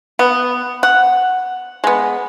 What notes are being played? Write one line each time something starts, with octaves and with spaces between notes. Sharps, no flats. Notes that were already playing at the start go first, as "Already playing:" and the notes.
B3
F#5
G#3 B3